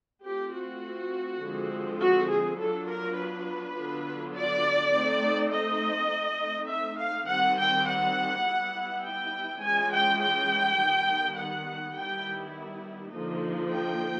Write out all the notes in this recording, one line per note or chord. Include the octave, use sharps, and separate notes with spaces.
A3 C4 F4 G4
F#4
D3 F3 G#3 C4
F#4
G#4
F#3 B3 D4 F4 A4
A#4
B4
D3 F#3 B3 D4 F4
D5
A3 C4 D#4
D#5
A3 C4 D#4
E5
F5
D#3 G3 C4 F#5
G5
F#5
G3 B3 E4
G5
E3 G#3 C#4 F4 G#5
G5
G5
D#3 G3 B3
F#5
D#3 G3 B3 E4 G5
D3 F3 A#3 D#4
G5